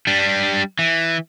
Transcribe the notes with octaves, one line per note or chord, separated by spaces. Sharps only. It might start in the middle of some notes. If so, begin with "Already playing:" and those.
G3 D4
E3